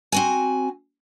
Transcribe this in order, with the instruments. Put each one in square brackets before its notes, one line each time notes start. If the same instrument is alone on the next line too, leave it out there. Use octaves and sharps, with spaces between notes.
[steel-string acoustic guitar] C4 F#4 G#5